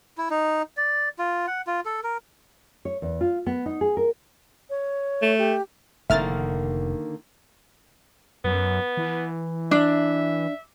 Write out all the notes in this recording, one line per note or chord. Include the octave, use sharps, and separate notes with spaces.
E4
D#4
D5
F4
F#5
F4
A4
A#4
C#5
E2
F4
B3
D#4
G#4
A#4
C#5
A3
G4
F1 D3 D#3 A#3 E5 F6 A6
F#2 B3
E3
D4 E5